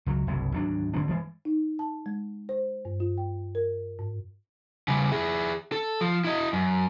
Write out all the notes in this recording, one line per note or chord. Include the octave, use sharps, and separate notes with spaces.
C#2 F#3
F#1 C2 G2
G#1 D2 F#3 D4
G#1 D3 C4 D4
G2 E3 G#3
D#4
A5
G#3
C5
G2
F4
G5
A#4
G#2
C#3 G3
E4 G#4
A4
F3
E4 D#5
F#2